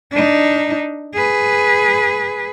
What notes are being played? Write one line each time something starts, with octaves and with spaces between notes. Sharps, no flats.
D4 D#4
G#4 B4